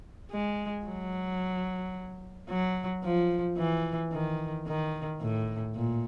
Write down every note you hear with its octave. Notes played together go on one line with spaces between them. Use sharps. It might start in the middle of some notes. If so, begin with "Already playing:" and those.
G#3
F#3
F#3
F3
E3
D#3
D#3
A2
A#2